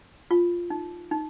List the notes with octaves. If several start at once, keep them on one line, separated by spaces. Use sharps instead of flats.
F4
D#4
D#4